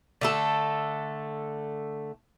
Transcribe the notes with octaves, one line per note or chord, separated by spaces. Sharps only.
D3 A3 A4